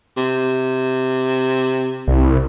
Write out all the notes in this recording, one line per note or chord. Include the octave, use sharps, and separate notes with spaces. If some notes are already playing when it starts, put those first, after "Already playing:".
C3
C2